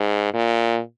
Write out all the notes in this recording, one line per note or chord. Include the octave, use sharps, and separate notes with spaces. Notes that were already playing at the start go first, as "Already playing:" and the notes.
Already playing: G#2
A#2